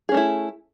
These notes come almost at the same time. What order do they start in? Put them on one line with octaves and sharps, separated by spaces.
G#4 C#4 A3 E4